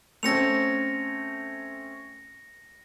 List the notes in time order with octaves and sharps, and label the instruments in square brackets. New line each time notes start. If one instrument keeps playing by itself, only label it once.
[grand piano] A3 C4 C#4 [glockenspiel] A#6 C#7 F7